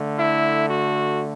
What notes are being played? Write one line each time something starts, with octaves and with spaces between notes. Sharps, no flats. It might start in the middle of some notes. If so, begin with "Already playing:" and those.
Already playing: D3 A3
E4
F#4